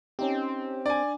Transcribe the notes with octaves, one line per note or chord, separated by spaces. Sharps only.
C4 C#4 D#4 G4
D4 D5 G#5